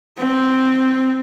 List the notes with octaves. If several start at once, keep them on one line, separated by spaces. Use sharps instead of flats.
C4